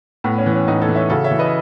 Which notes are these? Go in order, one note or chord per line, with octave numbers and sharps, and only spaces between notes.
A2 B3
C#4
E3
C#4
A2 B3 D#4
A4 C#5
E3
C#5 E5
C#3 F#4 A4
C#5 E5
E3
B4 D#5